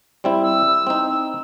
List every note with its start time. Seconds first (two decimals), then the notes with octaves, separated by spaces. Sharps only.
0.24 G3 C4 E4
0.42 E6
0.87 C4 D#4